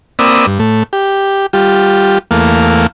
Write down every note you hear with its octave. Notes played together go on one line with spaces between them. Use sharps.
A#3 C4 D5 B5 D#6 E6
G2
A2 A3
G4
G3 F4 G4
E2 A3 A#3 F5